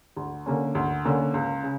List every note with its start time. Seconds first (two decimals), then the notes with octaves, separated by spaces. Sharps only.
0.16 D2
0.46 D3 A#3 C#4
0.75 D2
1.05 D3 A#3 C#4
1.34 C#2
1.63 C#3